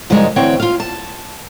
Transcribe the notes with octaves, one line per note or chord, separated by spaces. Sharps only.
F#2 C#3 F3 G3 G#3 D#4
D2 E3 C4 C#5 F#5 G5
F4 F5
A5